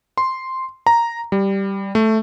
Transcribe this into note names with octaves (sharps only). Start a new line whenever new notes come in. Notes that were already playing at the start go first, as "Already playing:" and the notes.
C6
A#5
G3
A3